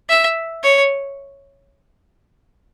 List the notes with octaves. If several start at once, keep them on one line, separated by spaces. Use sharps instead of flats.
E5
C#5